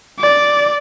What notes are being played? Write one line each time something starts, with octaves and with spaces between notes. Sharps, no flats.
D5